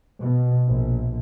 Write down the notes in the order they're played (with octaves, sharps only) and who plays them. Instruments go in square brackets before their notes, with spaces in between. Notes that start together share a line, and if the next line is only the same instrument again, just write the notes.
[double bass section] B2
A#1